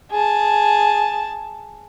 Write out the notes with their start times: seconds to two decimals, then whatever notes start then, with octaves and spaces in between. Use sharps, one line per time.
0.11 G#4 A5